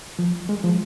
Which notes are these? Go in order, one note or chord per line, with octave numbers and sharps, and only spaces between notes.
F3
G#3
F3